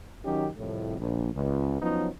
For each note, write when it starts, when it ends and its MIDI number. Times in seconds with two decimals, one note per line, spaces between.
0.25 0.48 51
0.25 0.48 54
0.25 0.48 61
0.25 0.48 63
0.25 0.48 67
0.57 0.97 36
0.57 0.97 41
0.57 0.97 45
0.99 1.32 34
1.34 1.79 37
1.81 2.08 53
1.81 2.08 54
1.81 2.08 59
1.81 2.08 61
1.81 2.08 63